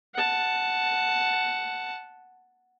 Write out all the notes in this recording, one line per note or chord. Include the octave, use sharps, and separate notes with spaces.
F#5 A5